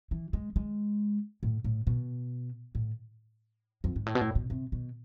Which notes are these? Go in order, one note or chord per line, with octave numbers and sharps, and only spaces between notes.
E3
G#3
G#3
A2
A2
B2
A2
F2
G#2
A2
B2
A2
B2
C3
B2